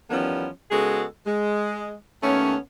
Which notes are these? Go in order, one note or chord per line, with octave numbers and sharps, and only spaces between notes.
E2 D#3 F3 G3 B3 C#4
C#3 G#3 B3 F#4 G#4 A4
G#3
D#2 A3 B3 C#4